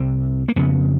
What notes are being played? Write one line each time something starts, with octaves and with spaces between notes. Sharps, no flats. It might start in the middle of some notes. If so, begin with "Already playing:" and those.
Already playing: C2 C3 C4
A#3
F2 C#3 B3